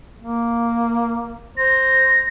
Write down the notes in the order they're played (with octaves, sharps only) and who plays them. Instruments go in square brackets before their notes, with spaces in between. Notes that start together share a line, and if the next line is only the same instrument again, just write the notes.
[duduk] A#3
[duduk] C5 [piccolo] A#6